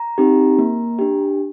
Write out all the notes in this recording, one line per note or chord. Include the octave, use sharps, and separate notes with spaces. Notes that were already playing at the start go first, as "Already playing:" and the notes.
Already playing: A#5
C4 D#4 G4
A#3
D4 G4